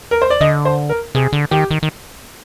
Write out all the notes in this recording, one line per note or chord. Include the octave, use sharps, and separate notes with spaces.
A#4
C5
D5
D3 D#5
C5
A#4
C3 G#4
D3
D#3 G4
D#3
D#3